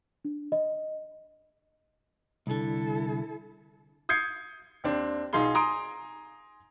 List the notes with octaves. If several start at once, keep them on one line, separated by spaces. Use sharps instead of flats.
D4
D#5
C2 D3 E4 A4
D#6 G6 G#6 C7 C#7
D#2 C4 D4
B1 D#4 F4 G#4 C6 G7
G#5 A#5 C6 D#6 D7